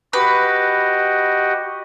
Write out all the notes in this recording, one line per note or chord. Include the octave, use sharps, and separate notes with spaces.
F#4 G4 B4 D#5